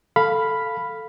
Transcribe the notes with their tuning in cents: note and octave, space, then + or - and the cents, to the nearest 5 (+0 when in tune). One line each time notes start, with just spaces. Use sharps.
A4 +0 F5 +0 B5 +0